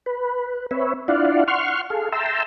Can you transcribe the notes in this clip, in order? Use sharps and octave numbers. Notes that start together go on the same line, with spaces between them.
B4
C4 B4 C#5 E5
D4 E4 F4 D5 F5 F#5
F#5 C6 C#6 F6
G#4 A4 F5
E5 G5 A5 A#5 C6 E6